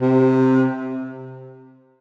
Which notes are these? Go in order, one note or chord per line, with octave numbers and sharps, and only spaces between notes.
C3